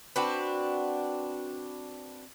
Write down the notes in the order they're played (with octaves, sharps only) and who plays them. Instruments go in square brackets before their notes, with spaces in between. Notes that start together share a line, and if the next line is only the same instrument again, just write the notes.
[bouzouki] C4 D4 F#4 B4